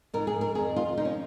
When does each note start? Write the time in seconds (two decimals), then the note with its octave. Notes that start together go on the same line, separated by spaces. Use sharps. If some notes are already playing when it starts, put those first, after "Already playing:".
0.14 G#2 A#4
0.17 F3
0.27 G#4
0.41 A#4
0.55 D#3 G#4
0.58 F2
0.76 F4
0.97 C#3 F3 D#4
1.05 C#4